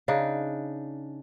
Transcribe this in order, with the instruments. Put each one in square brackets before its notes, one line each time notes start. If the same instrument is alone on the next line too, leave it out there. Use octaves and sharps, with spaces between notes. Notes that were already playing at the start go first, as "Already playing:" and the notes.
[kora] C#3 D4 D#4